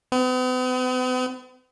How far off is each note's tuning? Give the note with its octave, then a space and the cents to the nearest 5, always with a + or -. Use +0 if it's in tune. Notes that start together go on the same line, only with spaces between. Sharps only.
B3 +45